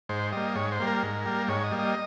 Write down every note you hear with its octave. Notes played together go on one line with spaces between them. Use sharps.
G#2 C5
G3 A#3 D#5
G#2 C#5
C5
G3 A#3
A#4
G#2
G3 A#3
G#2 C#5
D#5
G3 A#3
D#5